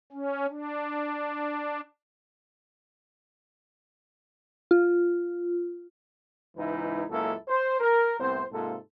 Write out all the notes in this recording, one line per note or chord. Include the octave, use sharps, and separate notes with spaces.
C#4
D4
F4
C#2 G#2 E3 D#4 E4 B4
C#2 F#2 A#3 E4 A4
C5
A#4
C2 A2 B3 C4 C5
G#2 C3 A#3 F4 A4